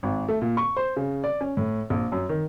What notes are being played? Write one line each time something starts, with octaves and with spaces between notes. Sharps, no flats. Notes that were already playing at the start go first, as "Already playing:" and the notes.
G#1
A3
A#2
C#6
C5
C#3
D5
C#4
A2
A#1
F#2
D#3